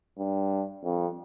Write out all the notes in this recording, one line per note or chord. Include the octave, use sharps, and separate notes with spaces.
G2
F2